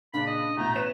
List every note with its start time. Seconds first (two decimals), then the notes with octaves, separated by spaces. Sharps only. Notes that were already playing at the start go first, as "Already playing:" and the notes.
0.14 A#2 C#3 D4 B5
0.27 D#5
0.57 A1 B2 A3 A#5 G6
0.75 B4 C#5 E7